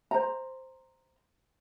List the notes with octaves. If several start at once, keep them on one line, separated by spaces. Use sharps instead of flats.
C5 A#5